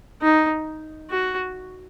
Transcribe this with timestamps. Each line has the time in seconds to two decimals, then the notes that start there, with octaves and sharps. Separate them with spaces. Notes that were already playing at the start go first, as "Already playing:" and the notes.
0.22 D#4
1.10 F#4